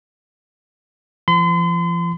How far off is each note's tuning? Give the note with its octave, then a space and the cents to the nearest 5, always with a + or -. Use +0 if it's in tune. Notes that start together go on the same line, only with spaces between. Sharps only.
F3 -40 C6 -40